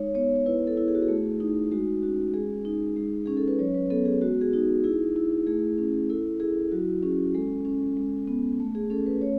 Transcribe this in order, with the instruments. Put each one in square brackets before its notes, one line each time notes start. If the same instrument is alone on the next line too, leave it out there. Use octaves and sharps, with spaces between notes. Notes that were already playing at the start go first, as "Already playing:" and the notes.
Already playing: [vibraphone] G#3 D#4 C#5
B3 C#5
C#5
E4 B4
A4
E4
G#4
F#4
G#4
A3
D#4
G#3 F#4
C#4 F#4
G#3 G#4
D#4
G#3
C#4 G#4
A4
B4
F#3 C#5
B4
B3 A4
G#4
G#3 F#4
G#4
D#4 F#4
E4 G#4
E4
A3 G#4
C#4
E4 A4
E4 G#4
F#3 F#4
C#4 G#4
G#3 A4
C#4
G#3
B3
A3
G#4
C#4 A4
B4
A3 C#5